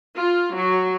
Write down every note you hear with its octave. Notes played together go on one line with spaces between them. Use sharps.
F4
F#3